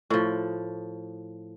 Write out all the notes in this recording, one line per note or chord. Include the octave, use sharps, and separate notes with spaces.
A2 F3